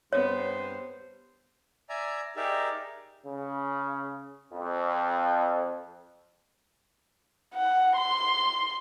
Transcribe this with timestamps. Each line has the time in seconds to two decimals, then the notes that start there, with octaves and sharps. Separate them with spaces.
0.13 G2 B3 C5 C#5
1.89 D5 E5 G#5 A#5
2.36 D#4 G4 G#4 A#4 D5 E5
3.25 C#3
4.53 F2
7.54 F#5
7.96 C6